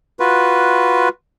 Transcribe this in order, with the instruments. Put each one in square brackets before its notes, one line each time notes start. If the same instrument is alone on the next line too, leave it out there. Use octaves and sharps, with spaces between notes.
[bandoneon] F4 F#4 B4